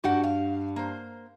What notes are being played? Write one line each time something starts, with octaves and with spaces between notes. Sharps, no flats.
G2 F#4 G4 F#5
F5
A#3 C5